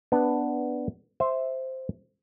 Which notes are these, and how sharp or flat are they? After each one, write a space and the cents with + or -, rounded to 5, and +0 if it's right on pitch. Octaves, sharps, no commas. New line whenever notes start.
B3 +0 D4 +0 B4 +0
C5 +0 E5 -5